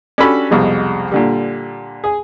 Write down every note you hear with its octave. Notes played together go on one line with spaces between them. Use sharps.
C#4 D4 F#4 G4 A4 B5
C2 F2 B2 G3 G#3
A#2 D3 G3
G#4